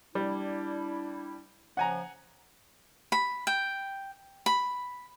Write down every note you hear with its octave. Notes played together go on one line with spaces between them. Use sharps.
G3 D4 E4
C#3 F3 F#5 G#5 A#5
B5
G5
B5